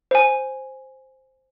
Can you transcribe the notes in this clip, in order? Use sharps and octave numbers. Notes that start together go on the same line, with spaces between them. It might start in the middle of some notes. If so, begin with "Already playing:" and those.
C5 G#5